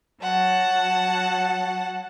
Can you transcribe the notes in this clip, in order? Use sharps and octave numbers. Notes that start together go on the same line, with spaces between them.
F#3 F#5 A5